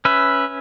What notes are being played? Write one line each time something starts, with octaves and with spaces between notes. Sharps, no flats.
C#4 B4 E5